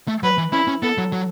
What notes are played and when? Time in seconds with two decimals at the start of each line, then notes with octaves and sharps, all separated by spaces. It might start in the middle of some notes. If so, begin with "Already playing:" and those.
0.08 A3
0.23 F#3 B4
0.38 E3
0.52 C#4 E4
0.68 C#4
0.83 B3 A4
0.98 F#3
1.12 F#3